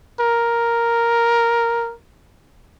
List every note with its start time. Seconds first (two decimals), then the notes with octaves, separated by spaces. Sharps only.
0.20 A#4